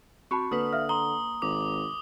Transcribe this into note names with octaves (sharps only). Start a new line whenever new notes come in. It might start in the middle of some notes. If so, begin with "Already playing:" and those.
C4 F#4 A5 B5 C#6
D3 A#3 B4 D#6
E5 F5 F6
A#5 C6 D#6 G7
G#1 D6